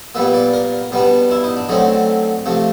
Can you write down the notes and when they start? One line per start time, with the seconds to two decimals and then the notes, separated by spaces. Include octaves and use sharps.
0.15 A#2 G3 B3 E5
0.34 D5
0.53 A#4
0.92 B2 G3 B3 D4
1.31 E4
1.44 D#4
1.57 D4
1.69 D3 F#3 A3 C4 D#4
2.46 C3 F3 A3